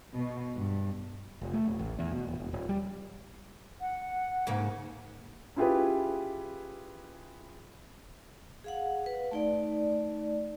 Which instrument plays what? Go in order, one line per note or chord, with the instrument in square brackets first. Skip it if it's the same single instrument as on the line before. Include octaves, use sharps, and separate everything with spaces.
[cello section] B2
G2
[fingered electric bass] F1
A3
D#1
A1
E2
B2
D#1
E1
D#1
G3
[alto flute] F#5
[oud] G#2 C#3 A#3
[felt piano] C#4 E4 F4 G4 G#4 B4
[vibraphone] G#4 F5 F#5
B4
A3 D#4 D5